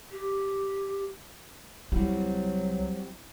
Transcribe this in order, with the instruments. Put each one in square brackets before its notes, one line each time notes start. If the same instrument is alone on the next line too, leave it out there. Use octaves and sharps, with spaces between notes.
[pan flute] G4
[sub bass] C2 [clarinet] F#3 [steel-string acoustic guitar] G3 C4 F#4 [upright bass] E4